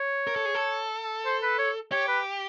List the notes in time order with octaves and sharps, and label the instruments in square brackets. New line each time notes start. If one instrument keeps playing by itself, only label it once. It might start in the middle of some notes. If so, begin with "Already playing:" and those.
Already playing: [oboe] C#5
[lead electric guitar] A#4
A4
G#4
A4
[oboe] C5
B4
C#5
[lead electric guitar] G4 [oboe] C#5
[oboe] B4